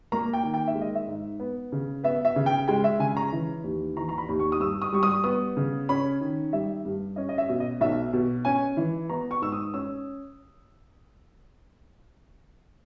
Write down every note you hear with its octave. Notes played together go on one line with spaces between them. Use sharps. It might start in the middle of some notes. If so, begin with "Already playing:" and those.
A#3 A#5
G5
D#3
G5
E5
G#3
D#5
E5
G#2
B3
C#3
B3 E5
E5
C#3
G5
G#3 G5
E5
C#3 G#5
A#5
E3
D#2
E3 A#5
A#5
B5
D#2
C#6
D#6
G2 E6
D#6
G3 C#6
D#6
B3 D#6
C#3
C#4 B5
D#3
G3 E5
G2
C#4 D#5
D#5
E5
B2
D#5
B1 E5
B2
C#4 G#5
E3
B3 A#5
C#6
G#2 E6
D#6
C#4 E6